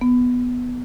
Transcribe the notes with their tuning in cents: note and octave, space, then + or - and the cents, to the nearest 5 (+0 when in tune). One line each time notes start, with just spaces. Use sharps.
B3 +0